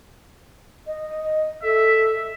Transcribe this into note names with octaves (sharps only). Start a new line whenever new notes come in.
D#5
A4 E5